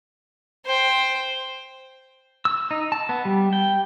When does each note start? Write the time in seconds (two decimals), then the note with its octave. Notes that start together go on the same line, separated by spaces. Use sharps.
0.66 C5 G5
2.45 E6
2.71 D#4
2.92 A5
3.09 B3
3.25 G3
3.53 G5